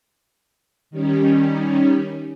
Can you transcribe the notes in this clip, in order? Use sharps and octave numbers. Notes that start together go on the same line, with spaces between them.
D#3 G3 C#4